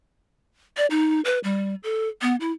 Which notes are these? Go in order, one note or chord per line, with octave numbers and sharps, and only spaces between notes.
D5
D#4
B4
G3
A4
B3
E4